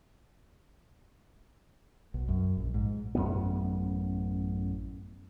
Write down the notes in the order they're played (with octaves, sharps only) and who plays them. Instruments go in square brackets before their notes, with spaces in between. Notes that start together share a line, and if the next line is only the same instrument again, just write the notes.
[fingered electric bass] B1
F#2
A#1
G#2
[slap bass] A1 F#2 B2 B3